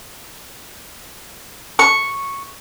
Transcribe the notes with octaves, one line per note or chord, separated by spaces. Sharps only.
C#6